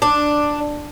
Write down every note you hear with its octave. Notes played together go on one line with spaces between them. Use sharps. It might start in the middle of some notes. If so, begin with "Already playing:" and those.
D4